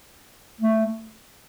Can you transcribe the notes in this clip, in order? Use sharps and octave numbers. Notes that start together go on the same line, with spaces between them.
A3